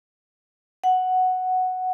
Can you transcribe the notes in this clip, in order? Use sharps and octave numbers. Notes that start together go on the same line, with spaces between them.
F#5